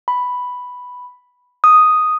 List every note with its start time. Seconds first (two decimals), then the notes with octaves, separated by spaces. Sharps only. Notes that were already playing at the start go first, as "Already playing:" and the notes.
0.08 B5
1.64 D#6